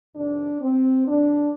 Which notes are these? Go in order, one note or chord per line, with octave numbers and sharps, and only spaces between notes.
F2 C3 D#3 D4
C4
F2 D3 D4